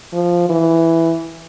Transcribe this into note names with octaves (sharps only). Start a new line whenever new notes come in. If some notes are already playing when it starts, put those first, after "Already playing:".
F3
E3